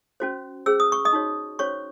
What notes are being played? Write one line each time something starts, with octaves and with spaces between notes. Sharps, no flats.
C#4 F#4 C5
C#4 G#4 C5 E6
D#6
C#6
D#5 D#6
D#4 F#4 C#5
C#4 F#4 C5 C#5 C#6